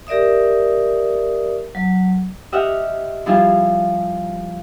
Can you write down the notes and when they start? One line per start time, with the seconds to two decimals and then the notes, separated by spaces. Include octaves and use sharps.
0.07 G4 A#4 D5 E5 D#6
1.75 F#3
2.52 G4 D#5 E5 F#5 F6
3.26 F3 G3 E4 F4 G#4